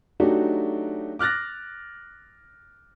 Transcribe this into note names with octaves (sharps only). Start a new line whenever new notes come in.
F#3 A3 D4 D#4 F#4 G4
D6 F6 F#6 A6 A#6